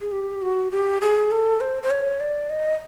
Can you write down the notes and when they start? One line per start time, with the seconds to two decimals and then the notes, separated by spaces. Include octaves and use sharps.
0.01 G#4
0.12 G4
0.42 F#4
0.71 G4
1.02 G#4
1.31 A4
1.61 C5
1.83 C5
1.90 C#5
2.20 D5
2.50 D#5